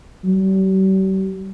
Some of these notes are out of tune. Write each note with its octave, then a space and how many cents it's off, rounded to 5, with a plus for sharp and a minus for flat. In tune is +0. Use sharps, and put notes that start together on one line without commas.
G3 -45